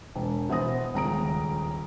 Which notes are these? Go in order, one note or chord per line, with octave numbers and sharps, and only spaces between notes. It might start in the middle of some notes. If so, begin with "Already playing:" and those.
E1
B2 E3 C5 D#6 A#6
D#1 C#2 C#3 A#5 D#6 D7